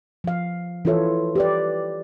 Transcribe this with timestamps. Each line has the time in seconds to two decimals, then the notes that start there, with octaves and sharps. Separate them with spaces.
0.24 F3 F5
0.85 E3 E4 F4 A4 C#5 E5
1.35 G4 B4 D5